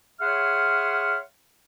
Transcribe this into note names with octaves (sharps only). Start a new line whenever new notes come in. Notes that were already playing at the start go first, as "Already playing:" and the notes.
G#4 C#5 E5 F#5 C6 F6